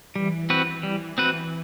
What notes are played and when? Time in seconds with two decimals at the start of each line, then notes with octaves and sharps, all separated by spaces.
0.15 E3 G3
0.50 C4 F#4 B4
0.83 G3
1.18 C4 F#4 B4